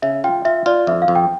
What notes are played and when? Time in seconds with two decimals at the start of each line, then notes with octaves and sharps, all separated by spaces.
0.02 C#3 E5
0.24 F4 G5
0.45 F4 E5
0.66 F4 D5
0.87 F2 E5
1.02 F5
1.08 F2
1.15 G5